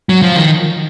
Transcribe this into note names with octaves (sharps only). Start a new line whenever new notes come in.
F#3
F3
D#3